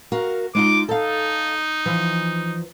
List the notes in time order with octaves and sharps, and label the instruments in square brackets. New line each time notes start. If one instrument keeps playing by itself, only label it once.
[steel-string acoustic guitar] F#4 A#4 F5
[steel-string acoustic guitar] G#3 D#4 F4 [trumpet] D6
[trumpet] D#4 [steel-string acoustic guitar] A4 F5
[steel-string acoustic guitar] E3 F3